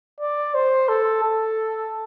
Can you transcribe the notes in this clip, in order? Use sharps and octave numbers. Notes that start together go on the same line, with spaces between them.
D5
C5
A4
A4